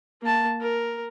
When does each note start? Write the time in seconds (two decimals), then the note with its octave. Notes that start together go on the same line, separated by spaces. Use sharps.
0.22 A#3 A5
0.61 A#4